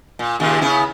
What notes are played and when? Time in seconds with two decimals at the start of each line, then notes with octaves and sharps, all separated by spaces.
0.19 A#2
0.40 D#2 A#2 C#3
0.61 C#3 B3 E4